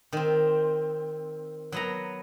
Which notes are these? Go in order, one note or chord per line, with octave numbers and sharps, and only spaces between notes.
D#3 C4
F#3 B3 A#5